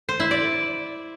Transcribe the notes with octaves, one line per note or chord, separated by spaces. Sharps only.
C5
E4
D5